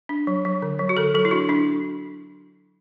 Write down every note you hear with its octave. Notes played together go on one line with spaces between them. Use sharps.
D4
F#3
F#3
D3
F#3
F#4
D3 A4
F#3 A4
E4
D4 F#4
D4 E4